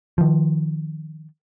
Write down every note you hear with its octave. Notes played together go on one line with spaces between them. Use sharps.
D#3 F3